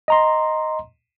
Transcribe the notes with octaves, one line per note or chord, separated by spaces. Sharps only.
D#5 A#5 C6